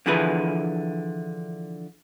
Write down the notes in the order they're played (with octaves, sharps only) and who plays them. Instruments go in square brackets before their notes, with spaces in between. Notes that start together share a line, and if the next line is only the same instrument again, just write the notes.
[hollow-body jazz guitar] D3 E3 F3 E4 G#4 B4